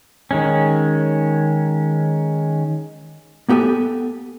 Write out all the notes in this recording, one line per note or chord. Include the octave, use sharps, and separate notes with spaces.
D#3 G#3 C#4
A#3 B3 G4 A4 G#5